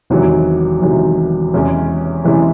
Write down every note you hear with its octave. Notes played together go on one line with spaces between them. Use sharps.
E1 E2 C3 D#3 F#3
E1 E2 C3 D#3 F#3
E2 C3 E3 G#3 C#4
E2 C3 E3 G#3 C#4